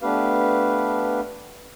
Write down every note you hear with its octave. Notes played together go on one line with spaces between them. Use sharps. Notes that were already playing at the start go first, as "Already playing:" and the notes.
A3 B3 D4 G4 B4 F5